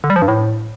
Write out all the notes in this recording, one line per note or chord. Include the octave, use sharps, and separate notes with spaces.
D3
G3
F3
G2
A2